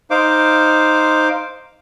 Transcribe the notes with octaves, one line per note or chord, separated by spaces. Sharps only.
D#4 C5 F5 D6